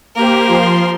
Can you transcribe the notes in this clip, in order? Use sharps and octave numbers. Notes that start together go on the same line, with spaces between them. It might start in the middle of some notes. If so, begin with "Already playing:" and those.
A#3 G4 A#4 C5
F3 C6